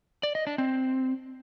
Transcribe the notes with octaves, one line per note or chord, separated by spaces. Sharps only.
D5
D#5
D4
C4